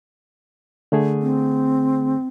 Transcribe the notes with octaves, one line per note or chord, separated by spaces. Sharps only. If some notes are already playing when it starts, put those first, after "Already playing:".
D3 A3 G#4
C4